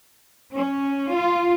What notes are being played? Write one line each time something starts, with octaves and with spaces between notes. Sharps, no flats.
C#4
F4